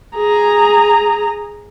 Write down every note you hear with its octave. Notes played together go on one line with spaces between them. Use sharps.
G#4 A#5